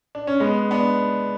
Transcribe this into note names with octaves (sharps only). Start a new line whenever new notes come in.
D4
C#4
G#3 B3
B3 D4